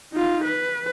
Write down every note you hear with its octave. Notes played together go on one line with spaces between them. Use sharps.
D#4 F4
B4